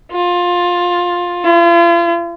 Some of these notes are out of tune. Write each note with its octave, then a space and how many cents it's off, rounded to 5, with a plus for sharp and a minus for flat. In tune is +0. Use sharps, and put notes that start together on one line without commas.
F4 +15
F4 -40